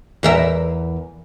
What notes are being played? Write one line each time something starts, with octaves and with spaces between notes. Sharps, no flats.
E2 A#4 E5